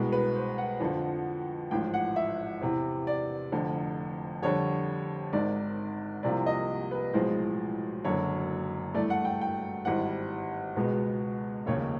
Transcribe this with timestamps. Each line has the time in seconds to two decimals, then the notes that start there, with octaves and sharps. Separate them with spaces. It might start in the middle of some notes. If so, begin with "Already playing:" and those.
Already playing: C2 B2 G#3 B3
0.12 B4
0.36 C5
0.58 F#5
0.80 F2 D3 F3
1.71 A1 G#2 F3 G5
1.94 F#5
2.16 E5
2.61 E2 C3 E3
3.07 D5
3.52 F1 F2 D3
4.43 F2 D3 G3 C#5
5.33 G#1 G#2 D#3 D5
6.23 C2 C3 F3 A#3 D5
6.46 D#5
6.91 B4
7.14 B1 A2 F3 G#3 C5
8.04 F#1 F#2 D3 C#5
8.94 G2 E3 A3 D5
9.10 F#5
9.25 G5
9.41 G5
9.85 G#1 G#2 E3 G3 F#5
10.76 C#2 B2 G#3 B3
11.66 F1 D#2 C#3 C#5